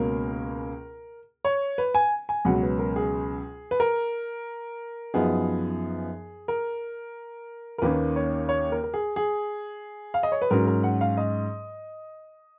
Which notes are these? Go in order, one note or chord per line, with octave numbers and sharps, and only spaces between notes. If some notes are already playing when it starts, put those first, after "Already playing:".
Already playing: C#2 B2 A#3 C#4 A#4
C#5
B4
G#5
G#5
C#2 B2 F#3 C#4 F#5
B4
A#4
G#4
B4
A#4
F#2 F3 B3 D#4 G#4
A#4
A#4
D#2 D#3 A#3 C#4 B4
C#5
C#5
A#4
A#4
G#4
G#4
F5
D#5
C#5
B4
G#2 F#3 C#4 A#4
A#4
F#5
F5
D#5